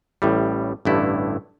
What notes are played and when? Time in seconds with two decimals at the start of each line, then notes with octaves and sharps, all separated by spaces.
0.22 A1 A2 G3
0.85 A1 G2 D3 A3 E4